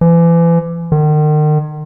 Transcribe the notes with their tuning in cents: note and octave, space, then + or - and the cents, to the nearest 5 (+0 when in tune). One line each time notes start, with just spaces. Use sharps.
E3 +35
D#3 -40